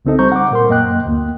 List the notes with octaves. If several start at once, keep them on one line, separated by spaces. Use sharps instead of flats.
C2 C#3 C4 D#4 A4 D#5
G3 C5 A#5 C#6 G6
F#5 D6
A#2 A#4 C6
F#2 A#3 D#5 G5 F#6
D2 A#3